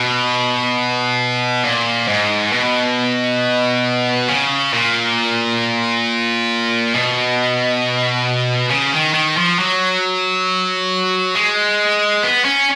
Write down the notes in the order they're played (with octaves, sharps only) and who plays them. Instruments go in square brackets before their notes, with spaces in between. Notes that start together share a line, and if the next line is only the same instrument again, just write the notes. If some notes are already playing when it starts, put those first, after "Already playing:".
Already playing: [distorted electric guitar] B2
A#2
G#2
B2
C#3
A#2
B2
C#3
D#3
D#3
F3
F#3
G#3
B3
C#4